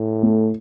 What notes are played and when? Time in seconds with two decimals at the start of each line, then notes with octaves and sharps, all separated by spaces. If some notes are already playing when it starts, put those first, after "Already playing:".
Already playing: A2
0.23 A3